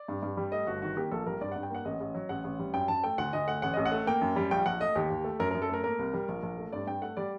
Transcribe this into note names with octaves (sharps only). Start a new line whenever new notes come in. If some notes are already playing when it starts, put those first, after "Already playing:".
Already playing: D5
G2
G2
G3
A3 D#5
G1 F#4
D#3 F#4
A#3 G4
A#1 A4
G3 A#4
G2 D5
G2 F#5
G5
A#3 F#5
A1 D#5
A1
F#3
A1 F#5
A1
G3
F#2 G5
F#2 A5
A3 G5
D2 F#5
D2 D#5
A3 F#5
A1 F#5
A1 D#5
F#5
A3
A#3 G5
F#2
G3
A#1 G5
A#1 F#5
A3 D#5
D#2 G4
D#2
A3
F#2 A#4
F#2 A#4
A4
A3 A#4
A#3 A#4
C2
G3
A#1
A#1
A3
G2 D5
G2 G5
A3 F#5
G3 D5